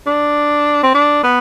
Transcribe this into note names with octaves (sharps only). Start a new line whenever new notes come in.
D4
C4
D4
B3